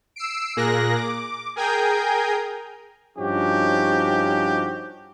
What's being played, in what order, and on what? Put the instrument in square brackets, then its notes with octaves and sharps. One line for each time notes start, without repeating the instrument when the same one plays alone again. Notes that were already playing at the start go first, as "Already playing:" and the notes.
[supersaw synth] E6 C7 D7
A#2 A#3 G#4 A#4 F#6 A#6
D6
G#4 A#4 G5 G#5 A#5 G6
[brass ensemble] G2 F3 C#4 D#4 F#4 G4